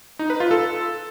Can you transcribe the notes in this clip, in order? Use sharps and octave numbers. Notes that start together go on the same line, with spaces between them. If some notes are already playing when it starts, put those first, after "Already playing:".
D#4
B4
F4
A4